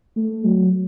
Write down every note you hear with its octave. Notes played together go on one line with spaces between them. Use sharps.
A3
F#3